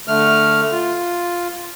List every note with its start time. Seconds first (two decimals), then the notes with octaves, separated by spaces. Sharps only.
0.08 D3 A3 F6
0.72 F4